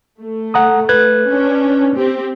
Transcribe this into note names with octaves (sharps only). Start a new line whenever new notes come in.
A3
F#5 A#5 D#6
B4 F#6 G#6
C#4 D4
C4 G4